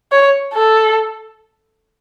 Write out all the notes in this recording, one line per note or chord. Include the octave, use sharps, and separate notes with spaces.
C#5
A4